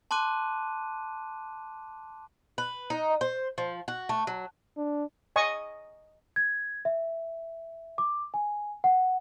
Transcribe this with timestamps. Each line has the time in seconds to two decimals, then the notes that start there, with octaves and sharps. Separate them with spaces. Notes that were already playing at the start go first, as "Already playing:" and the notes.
0.11 A5 C6 D6 F#6 D#7
2.58 B4
2.90 D#4
3.21 C5
3.58 F3
3.88 F#4
4.09 A3
4.27 F#3
4.77 D4
5.36 D#5 G#5 C#6 D#6
6.36 G#6
6.85 E5
7.98 D6
8.34 G#5
8.84 F#5